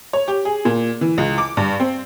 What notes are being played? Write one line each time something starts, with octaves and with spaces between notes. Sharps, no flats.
C#5
G4
G#4
A#2
E3
C#2
D6
G2
C4